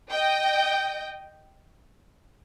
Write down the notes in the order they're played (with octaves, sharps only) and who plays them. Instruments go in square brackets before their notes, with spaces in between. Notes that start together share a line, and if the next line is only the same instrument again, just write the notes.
[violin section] D#5 G5